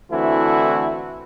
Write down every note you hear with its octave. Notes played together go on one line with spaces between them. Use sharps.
D3 E3 A3 C4 E4 F#4